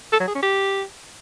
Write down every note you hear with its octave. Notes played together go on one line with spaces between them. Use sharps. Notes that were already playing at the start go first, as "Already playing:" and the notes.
A4
F#3
G#4
C#4
G4